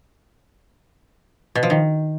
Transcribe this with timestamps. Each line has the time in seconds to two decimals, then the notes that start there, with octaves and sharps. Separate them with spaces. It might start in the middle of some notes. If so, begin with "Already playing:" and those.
1.55 B2
1.63 F3
1.70 D#3